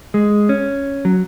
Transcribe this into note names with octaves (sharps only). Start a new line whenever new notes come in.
G#3
C#4
F#3